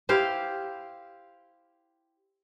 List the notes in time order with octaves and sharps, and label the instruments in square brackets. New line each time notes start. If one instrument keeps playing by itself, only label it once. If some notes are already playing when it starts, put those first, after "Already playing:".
[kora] E4 G4 C5 F5